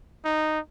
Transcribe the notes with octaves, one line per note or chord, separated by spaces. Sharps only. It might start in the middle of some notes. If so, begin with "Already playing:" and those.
D#4